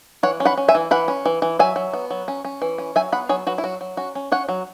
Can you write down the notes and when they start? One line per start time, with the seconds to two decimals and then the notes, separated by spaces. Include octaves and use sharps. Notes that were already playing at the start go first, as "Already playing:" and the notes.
0.23 E3 C#5 F#5
0.40 C#4
0.45 F#5 B5
0.57 C#4
0.68 E5 G#5
0.75 E3
0.91 E3 F#5 B5
1.08 C#4
1.26 E3
1.42 E3
1.59 F#3 E5 G#5
1.76 F#3
1.93 B3
2.11 F#3
2.28 C#4
2.45 C#4
2.62 E3
2.78 C#4
2.96 F#3 E5 G#5
3.12 B3 F#5 B5
3.29 F#3 G#4 C#5
3.47 F#3 F#4 B4
3.58 E4
3.64 F#3 F#4
3.81 F#3
3.97 C#4 F#4
4.15 C#4
4.32 C#4 C#5 F#5
4.49 F#3